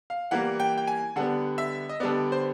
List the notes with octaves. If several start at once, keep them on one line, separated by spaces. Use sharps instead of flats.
F5
E3 G3 A#3 F#5
G5
G5
G#5
D3 G3 B3 F#5
E5
D#5
D3 G3 B3 D5
C5